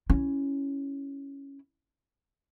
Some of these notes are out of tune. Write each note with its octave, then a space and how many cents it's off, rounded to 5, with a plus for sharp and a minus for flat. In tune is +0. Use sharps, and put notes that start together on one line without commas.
C#4 +0 E4 +0